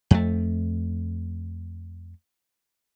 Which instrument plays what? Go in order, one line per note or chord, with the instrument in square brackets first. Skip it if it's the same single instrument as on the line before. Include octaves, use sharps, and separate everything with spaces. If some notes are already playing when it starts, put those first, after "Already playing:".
[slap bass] F2 A3